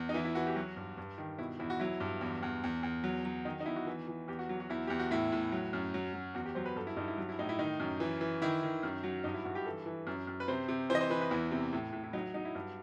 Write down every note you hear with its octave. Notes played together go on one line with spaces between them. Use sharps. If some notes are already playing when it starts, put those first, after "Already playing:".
Already playing: E2
D#4
E3 E4
E4
E3 F#4
G4
F#3 F#4
G2
G2
D#3
B2 E4
E2 E4
F#4
F#3 E4
G2
E2
E2
E2
E2
F#3
F#3
D#3 D#4
D#4
E2 E4
F#4
E3
E3
E2 G4
F#4
F#3
F#4
E2 E4
E2 G4
F#4
A2 E4
A2
F#3
F#2
F#3
F#3
E2 F#4
G4
F#3 C5
B4
G2 A4
E4
G2 D#4
E4
F#3
E4
A2 D#4
E4
D#3 D#4
F#2
E3
E3
D#3 E4
D#3
F#2
F#3
G2 D#4
E4
G2 F#4
G4
E3 A4
E3
F#2
F#2
B4
C3 C5
C3
E3 C5
D#5
C5
E3 B4
B4
E2 E4
C3
A2
A2
E4
F#3 D#4
F#3 D#4
E4
G2